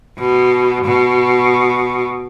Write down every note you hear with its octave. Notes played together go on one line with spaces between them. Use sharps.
B2
B2